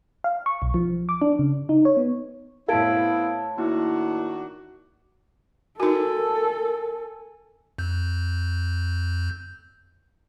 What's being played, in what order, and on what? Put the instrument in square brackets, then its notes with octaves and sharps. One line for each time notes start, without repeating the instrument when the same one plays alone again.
[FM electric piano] F5
C#6
B1
F3
D6
D4
C#3
D#4
C#5
B3
[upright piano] A2 A4 [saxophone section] B3 C4 E4 [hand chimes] F5 G#6 D7
[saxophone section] D#3 D4 F#4 [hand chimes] A#3 E4
[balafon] D#4 F#4 [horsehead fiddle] A4 [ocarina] A#4 [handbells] G#5
[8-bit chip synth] F2 G6